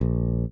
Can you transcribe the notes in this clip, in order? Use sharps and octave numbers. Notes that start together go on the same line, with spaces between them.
A#1